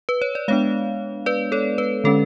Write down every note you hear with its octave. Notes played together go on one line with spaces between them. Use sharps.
B4
C#5
D5
G#3 B3 D4 C#5 F5
B4 D5
A4 C#5
B4
D3 G#3 C#4 A4